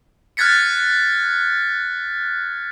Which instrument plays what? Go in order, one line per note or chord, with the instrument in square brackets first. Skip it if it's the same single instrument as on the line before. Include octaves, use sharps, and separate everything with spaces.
[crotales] F6 F#6 G#6 A6 B6 C#7